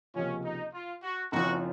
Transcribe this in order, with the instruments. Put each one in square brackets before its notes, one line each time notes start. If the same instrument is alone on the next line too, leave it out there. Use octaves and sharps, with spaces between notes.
[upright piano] C#2 C3 F3 A#3 F4 [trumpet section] C#4
[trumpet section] D#4
F4
F#4
[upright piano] F#1 F#2 F3 C4 F4 [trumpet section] F#4